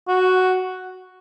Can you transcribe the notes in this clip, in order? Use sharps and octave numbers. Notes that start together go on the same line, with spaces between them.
F#4